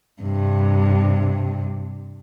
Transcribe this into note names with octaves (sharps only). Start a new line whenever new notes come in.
G2 C3